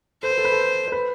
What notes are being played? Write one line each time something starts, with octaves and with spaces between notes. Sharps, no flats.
A4 C5
B4
A4
B4
A4
C5
B4